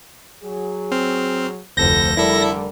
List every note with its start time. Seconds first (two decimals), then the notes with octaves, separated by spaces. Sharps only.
0.43 F#3 G#4
0.92 C4 C6 F6
1.77 F1 D2 F3 A4 G6 A#6
2.17 D3 G3 E4 A4 A#4 D5 E5